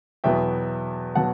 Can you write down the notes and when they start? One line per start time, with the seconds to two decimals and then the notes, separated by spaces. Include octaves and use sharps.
0.24 E2 B2 F#3 B3 E5 G5
1.15 B2 F#3 B3 F#5 A5